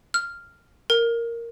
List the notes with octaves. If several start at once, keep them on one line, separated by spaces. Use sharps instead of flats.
F6
A#4